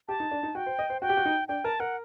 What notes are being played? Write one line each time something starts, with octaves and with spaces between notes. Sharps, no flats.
G4 A5
D#4
D4
D#4
F#4 G5
C5
D#5
C5
F#4 G5
G4
F#4
D#4
D4 G5
A#4 A5
A#4 F#5